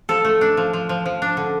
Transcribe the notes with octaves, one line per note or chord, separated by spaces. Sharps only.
F3 A4
A3
D4
F3
F3
F3
F3
D4
D3